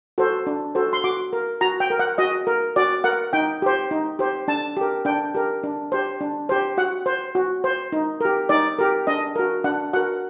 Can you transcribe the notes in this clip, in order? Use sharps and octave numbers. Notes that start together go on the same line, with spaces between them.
F#4 A4 C5
D4
F#4 A4 C5
C6
F#4 D6
A#4
F#4 A#5
G5
A#4
F#5
F#4 D#5
A#4
F#4 D5
A#4 F#5
D#4 G5
G4 C5
D#4
G4 C5
D4 A5
G4 A#4
D4 G5
G4 A#4
D4
G4 C5
D4
G4 C5
F#4 F#5
C5
F#4
C5
D#4
G4 A#4
D#4 D5
G4 A#4
D4 D#5
F#4 A#4
D4 F#5
F#4 A#4 F#5